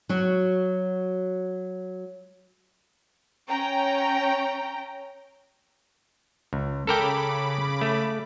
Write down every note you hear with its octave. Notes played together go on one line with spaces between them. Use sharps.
F#3 F#4
C#4 G5 A#5
C#2
C#3 A4 A#4 G5 B5 D6
A3